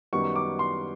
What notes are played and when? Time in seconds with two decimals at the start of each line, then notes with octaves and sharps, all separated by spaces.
0.13 F#2 D#3 G3 B3 C#6
0.36 D6
0.59 C6